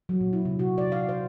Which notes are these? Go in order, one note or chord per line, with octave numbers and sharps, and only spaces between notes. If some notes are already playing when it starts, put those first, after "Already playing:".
F#3
A#2
E4
C3
F#4
D5
F5
C5